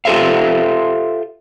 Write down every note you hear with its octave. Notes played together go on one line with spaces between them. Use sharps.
F4 G4 A4 C5 E5 F5